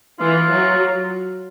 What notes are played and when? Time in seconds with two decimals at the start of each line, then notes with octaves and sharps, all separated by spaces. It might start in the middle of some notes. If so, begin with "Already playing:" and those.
0.20 E3 F4
0.51 F#3